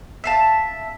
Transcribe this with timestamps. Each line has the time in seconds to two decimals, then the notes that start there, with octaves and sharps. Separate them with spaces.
0.24 E5 F5 A5